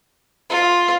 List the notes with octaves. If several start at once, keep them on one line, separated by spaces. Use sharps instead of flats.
F4